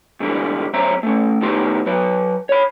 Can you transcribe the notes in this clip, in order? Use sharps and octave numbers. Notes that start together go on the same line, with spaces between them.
G#2 D3 E3 G3
F#2 C4 C5 C#5 E5 A#5
A3 C#4
A2 D#3 B3 D#4 G4 C6
F#3 B4
C#5 B5